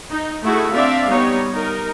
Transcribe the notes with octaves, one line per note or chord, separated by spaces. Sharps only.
D#4
A3 E4 F#4 G#4 A4
C4 D4 D5 E5 F5
G3 B3 D#4 C#5
D#4 A#4